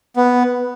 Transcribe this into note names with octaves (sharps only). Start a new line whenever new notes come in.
B3